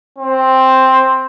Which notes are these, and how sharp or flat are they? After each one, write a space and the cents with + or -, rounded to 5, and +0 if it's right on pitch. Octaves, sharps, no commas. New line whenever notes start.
C4 +5